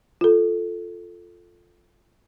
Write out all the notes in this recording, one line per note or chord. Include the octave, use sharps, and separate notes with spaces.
F4 A4